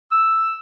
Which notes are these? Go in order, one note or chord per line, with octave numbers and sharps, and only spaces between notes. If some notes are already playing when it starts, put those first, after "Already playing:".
E6